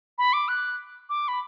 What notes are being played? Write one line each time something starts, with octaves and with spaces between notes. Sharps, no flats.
B5
D6
F#6
D6
B5